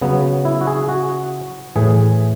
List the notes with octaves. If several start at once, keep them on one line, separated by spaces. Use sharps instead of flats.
C#3 F#3 B3
E4
F#4
G#4
F#4
A2 E3 G#4